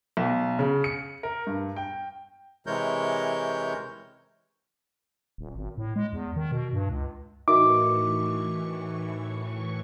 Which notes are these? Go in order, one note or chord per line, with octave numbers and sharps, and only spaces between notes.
B1
C#3
C#7
A#4
G2
G5
C3 E3 G#3 A#4 C#5 G6
D#1
G#1
A2
G#3
E2
D#3
B2
G2
C#2
A2 E3 D#4 F#4 A#4 E5 C#6 D6